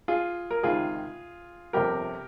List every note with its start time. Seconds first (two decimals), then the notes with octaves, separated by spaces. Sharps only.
0.08 F4 G#4
0.51 A#4
0.63 C#2 C3 D#3 F4 G#4
1.73 G1 F2 C3 G4 A#4